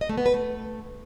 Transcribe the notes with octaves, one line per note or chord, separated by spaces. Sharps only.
D#5
A3
B3
B4
A3